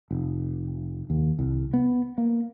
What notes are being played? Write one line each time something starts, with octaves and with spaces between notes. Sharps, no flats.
F1
D#2
C2
B3
A#3